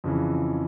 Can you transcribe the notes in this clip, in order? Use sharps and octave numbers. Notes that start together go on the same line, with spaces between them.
F2 C#3 E3